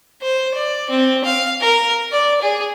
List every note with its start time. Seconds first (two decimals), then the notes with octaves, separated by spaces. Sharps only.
0.22 C5
0.54 D5
0.90 C4
1.24 F5
1.60 A#4
2.12 D5
2.41 G#4